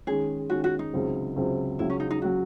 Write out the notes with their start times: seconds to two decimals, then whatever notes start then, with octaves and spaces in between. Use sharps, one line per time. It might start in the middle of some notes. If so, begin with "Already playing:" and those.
0.07 D#3 G#3 C#4 G#4
0.50 D#3 G#3 C#4 F#4
0.64 F#4
0.79 D#4
0.93 C#2 C3 F#3
1.36 C#2 C3 F#3
1.79 C#2 C#3 F#3 E4
1.90 C#4
2.00 D#4
2.11 D#4
2.22 C#3 F#3 F#4